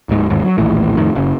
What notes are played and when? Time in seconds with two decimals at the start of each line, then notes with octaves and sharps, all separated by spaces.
0.09 D1 G#2
0.30 G1 D#2 G#2
0.45 F#3
0.58 A#1 D#2 A2 E3
0.97 F2 A2 D#3
1.15 F#1 C#3